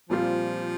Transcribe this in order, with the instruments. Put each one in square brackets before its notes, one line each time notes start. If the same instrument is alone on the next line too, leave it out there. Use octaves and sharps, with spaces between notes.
[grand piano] A#2 G3 C4 F4 [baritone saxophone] F3